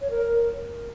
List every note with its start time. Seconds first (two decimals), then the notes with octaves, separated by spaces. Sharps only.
0.01 C#5
0.10 A#4